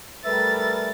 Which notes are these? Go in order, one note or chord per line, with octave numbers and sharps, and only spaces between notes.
G3 A3 A#4 B4 E5 A6